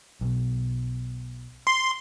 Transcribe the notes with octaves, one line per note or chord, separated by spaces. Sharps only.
B1 B2
C6